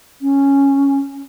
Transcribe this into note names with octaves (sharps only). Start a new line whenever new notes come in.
C#4